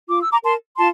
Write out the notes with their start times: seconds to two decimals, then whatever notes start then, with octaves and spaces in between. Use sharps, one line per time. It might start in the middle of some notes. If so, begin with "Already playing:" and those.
0.09 F4 D6
0.20 E6
0.31 A#5 D6
0.43 A#4 A5 C6
0.77 F4 A5 C6